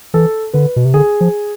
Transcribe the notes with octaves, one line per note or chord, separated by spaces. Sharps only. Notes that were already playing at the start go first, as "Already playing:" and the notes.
E3 A4
D3 B4
B2
C3
D3 G#4
F3